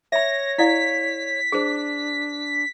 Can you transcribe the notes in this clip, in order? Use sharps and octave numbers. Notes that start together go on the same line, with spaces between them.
C#5 E5 B5 A#6
E4 D5 F5 B6
D4 G#4 C5